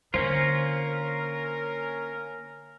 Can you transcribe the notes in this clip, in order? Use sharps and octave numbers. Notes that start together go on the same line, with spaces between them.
D3 A#3 C#4 F4 A#4 C5